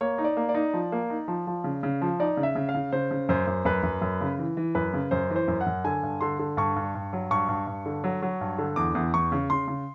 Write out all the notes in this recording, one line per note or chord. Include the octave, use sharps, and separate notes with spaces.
A#3 C#5
D#4
D5
A#3
D5
D#4
F3
A#3
D#4
F3
F3
C#3
C#3
F3
D#4 D5
C#3
E5
C#3
F5
C#3
C#3 C5
C#3
F#2 C5
F#2
F#2 B4
F#2
F#2
C#3
E3
E3
F#2 B4
C#3
F#2 C5
E3
C5
F#2
F#5
F#2
D3 G#5
G2
D3 C6
D3
G2 C#6
G2
G2
F#3
G2 C#6
G2
G2
D3
F#3
F#3
G2
D3
E2 D6
E2
E2 C#6
C#3
C#3 C6
C#3